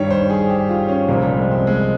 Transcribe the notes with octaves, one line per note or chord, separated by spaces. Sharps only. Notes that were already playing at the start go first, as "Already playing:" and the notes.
Already playing: G2 D#3 G3 C#5
C5
G#4
G4
F4
C#4
C2 A#2 F3 C4
G3
G#3
C4
G#3